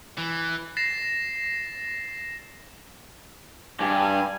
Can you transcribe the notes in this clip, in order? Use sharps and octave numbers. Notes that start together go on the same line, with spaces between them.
E3
A6 A#6 C7 E7
G2 G4 G#5